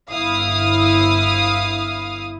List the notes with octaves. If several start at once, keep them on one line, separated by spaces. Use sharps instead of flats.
G1 E4 F5 D#6